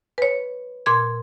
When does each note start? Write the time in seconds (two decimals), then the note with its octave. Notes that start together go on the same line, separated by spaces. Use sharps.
0.18 B4 C#5
0.86 A#2 C6 G#6